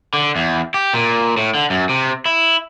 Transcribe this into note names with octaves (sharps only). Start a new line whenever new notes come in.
D3
E2
G4
A#2
A2
D3
F#2
C3
E4